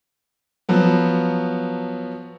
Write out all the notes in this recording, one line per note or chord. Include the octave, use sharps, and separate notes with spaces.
F3 F#3 B3